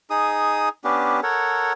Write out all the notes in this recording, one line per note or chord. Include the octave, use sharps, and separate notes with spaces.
D#4 G#4 D#6
B3 C#4 D4 G4
A4 A#4 C#5 F#5